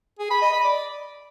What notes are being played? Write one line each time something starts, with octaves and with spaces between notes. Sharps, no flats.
G#4
B5
D#5
B5
D5